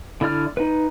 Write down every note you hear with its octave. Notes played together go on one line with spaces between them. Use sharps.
D3 E4 D5 F6
D#4 B4